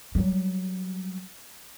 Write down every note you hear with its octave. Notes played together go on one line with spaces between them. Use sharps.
F#3 G3